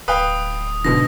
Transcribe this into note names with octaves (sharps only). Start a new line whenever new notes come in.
D1 B4 F5 G5 D#6
G#2 B2 D3 A#6